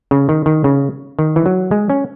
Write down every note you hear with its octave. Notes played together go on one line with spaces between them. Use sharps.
C#3
D#3
D#3
C#3
D#3
E3
F#3
G#3
C#4